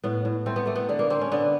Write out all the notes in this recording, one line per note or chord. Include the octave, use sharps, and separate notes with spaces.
A2 B3
A2
A3 C4
B3
A3 A#3
B3
D3 B3
A#3
A#3 C4
C#4
D3 B3